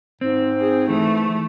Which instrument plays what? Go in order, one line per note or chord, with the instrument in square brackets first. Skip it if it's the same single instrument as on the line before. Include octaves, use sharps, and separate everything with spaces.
[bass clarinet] G#2 [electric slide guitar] C4
[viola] G#4
[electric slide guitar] E3 [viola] A3